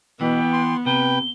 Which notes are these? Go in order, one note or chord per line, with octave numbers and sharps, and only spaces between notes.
B2 E3 B3 G5
C6
C3 B4 G5 G7